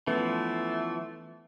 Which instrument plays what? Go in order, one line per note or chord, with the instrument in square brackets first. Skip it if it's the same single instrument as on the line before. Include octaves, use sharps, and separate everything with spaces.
[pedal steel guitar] E3 F3 [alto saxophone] A3 [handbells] B3 C#4 B4